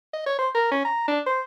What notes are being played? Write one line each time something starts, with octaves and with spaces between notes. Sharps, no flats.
D#5
C#5
C5
A#4
C#4
A#5
D4
C5